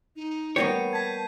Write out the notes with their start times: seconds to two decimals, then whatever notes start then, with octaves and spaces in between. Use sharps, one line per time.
0.16 D#4
0.56 G3 A#3 B3 C#5 G6 C7 D#7
0.93 A5 G#6 B6